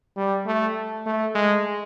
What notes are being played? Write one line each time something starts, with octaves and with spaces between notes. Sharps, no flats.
G3
A3
A3
G#3